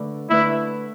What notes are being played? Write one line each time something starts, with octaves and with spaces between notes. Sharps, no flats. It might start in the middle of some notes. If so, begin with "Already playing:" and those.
Already playing: D3 A3 D4 B4 D5
D3 A3 D4 E4 B4 D5